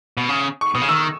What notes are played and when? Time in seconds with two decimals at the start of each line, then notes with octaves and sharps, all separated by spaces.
0.17 B2
0.29 C#3
0.61 C#6
0.75 B2 D#6
0.81 C#3
0.88 D#3 E6